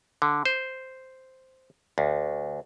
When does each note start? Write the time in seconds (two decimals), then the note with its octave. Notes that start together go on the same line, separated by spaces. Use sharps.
0.22 D3
0.45 C5
1.98 D2